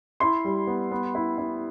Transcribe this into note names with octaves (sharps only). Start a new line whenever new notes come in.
E4 C6
G3
B3
B3
E4
E4